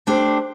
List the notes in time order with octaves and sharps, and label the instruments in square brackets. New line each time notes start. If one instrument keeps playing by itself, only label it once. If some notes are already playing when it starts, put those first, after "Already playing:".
[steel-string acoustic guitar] A3 D4 G4 C5